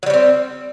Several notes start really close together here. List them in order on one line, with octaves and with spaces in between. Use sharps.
F#3 G3 C#4 C4